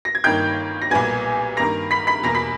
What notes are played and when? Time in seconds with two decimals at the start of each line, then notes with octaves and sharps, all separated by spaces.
0.05 A#6
0.15 G#6
0.24 G1 G2 D#3 A#3 D#4 G5 G6
0.82 A#6
0.91 B1 A#2 G3 B3 G#5 G#6
1.57 G2 D#3 A#3 A#5 A#6
1.91 B5 B6
2.07 B5 B6
2.23 E2 B2 A#3 A#5 A#6
2.35 B5 B6